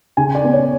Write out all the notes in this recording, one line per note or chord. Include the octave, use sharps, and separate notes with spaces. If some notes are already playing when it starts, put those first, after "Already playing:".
C#3 G#5
D5
B3
C#5